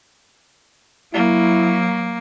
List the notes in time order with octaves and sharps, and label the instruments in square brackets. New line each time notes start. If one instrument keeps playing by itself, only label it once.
[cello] F#3 [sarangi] A#3 [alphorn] E4